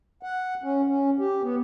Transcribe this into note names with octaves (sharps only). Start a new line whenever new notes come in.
F#5
C#4
C#4
G4
B3